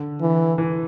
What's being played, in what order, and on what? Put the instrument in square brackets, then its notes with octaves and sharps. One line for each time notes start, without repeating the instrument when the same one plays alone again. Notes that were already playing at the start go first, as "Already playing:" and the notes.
Already playing: [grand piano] D3
[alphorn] E3
[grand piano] E3